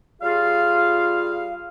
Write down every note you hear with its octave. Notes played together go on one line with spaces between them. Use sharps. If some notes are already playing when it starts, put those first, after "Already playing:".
G3 F4 G#4 F5